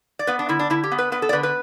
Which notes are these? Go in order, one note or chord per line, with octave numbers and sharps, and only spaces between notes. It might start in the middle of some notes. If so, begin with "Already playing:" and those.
D5
B3 B4
D4
D3 E4
D4
D3 E4
G4
B3
B4
B3 B4
A4
D5
D3 B4
B4